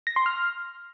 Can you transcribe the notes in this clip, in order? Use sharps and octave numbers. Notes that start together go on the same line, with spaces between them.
A#6
C6
F6